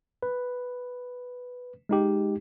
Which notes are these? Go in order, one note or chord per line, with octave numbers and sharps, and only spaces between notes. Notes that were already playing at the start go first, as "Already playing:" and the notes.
B4
G#3 D#4 G4